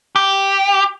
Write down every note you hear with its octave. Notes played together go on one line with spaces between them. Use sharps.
G4